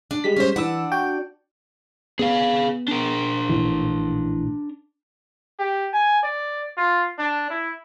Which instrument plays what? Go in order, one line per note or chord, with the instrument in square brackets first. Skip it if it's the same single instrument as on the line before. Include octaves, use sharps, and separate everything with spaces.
[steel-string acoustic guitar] D4
[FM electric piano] G3 G#3 B6
[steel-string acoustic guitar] C#4 C5
[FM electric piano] E3 B4 E6 [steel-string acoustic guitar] D4 F#5
[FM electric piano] F#4 G5
[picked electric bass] B3 [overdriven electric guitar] G#4 F5
[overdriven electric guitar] D4 A#4
[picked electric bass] A#1 A2 E3
[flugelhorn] G4
G#5
D5
F4
D4
E4